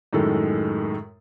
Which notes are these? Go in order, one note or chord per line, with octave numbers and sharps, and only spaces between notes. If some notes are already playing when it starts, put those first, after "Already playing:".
F#2 A2 D#3 G#3 A4